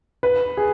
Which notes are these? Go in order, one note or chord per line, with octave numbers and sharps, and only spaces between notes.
B4
G#4